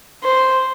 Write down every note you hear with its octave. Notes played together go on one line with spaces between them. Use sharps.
C5